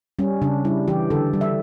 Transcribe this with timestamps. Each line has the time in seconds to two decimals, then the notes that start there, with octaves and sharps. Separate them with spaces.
0.19 G3 C#4
0.42 C#3 D4
0.65 G3 E4
0.88 E3 G4
1.10 D3 A4
1.33 G3
1.41 E5